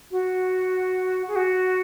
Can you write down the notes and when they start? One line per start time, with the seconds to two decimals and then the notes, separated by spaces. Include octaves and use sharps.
0.11 F#4
1.28 G#4
1.36 F#4